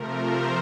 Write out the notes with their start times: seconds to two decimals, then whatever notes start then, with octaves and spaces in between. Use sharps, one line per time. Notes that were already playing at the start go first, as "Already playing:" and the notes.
Already playing: C3 F3 A3 A#4
0.13 C5